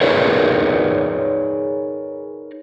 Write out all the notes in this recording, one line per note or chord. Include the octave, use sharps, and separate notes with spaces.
D#4 G#4 A#4 B4 C#5 D5